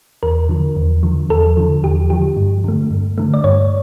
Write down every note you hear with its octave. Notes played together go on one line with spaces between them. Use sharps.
E2 A#4
D3 F3
E2
D3 F3
E2 A4
D3 F3
E2 G4
D3 F3 G4
G2
D3 A3
G2
D3 A3
D5
G2 C#5